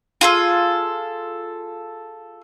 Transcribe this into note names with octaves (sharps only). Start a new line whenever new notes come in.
F4 G#4 A4